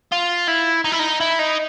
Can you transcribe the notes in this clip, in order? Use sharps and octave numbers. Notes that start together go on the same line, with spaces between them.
F4
E4
D#4
E4
D#4
E4
D#4